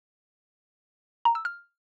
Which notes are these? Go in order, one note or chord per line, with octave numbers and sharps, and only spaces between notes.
A#5
E6
F6